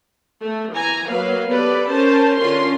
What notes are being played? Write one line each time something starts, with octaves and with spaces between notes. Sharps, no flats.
A3
E3 G#5 A#5
F#3 A#3 B4 F5
B3 G4 A4 B4 D5
C#4 A#4 C5 A5
D3 C#4 F4 A#4 C6